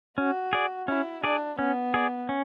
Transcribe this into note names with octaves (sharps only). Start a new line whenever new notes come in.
C#4 F#4
G#4 D5
C#4 E4
D4 G#4 D5
B3 C#4
G#4 D5
C#4